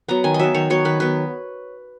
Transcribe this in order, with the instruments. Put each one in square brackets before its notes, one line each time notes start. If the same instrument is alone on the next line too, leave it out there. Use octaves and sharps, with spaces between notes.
[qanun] F#3 B3 A#5
D#3 G#5
D#5
F#3 B3 E5
D#3 C#5
F#3 B3 C#5
D#3 B4
F#3 B3 B4